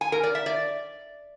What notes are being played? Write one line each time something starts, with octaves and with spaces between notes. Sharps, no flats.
G#5
A#4
D5
E5
D5